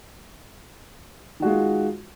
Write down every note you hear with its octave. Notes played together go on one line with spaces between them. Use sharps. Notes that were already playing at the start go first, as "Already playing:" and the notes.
D#3 G#3 F4 F#4